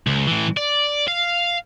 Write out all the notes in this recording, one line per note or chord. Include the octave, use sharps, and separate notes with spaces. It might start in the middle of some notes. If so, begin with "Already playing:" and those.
C#2
A2 E3
D5
F5